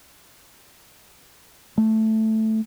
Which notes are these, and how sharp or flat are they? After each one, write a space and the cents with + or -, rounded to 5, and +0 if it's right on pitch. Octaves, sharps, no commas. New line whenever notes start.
A3 +0